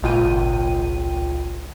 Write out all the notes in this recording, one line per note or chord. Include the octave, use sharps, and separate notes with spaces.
G#1 C#2 A#2 F4 G5 D#7